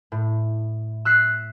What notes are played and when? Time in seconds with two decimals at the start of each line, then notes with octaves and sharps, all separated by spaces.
0.12 A2
1.05 E6 F#6 B6 C7